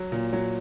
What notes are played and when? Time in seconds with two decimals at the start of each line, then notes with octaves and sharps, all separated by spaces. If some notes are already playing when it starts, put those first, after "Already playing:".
Already playing: F#3
0.12 A#2
0.33 F#3